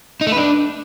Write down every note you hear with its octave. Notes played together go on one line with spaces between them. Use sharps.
D#4
A3
B4
D4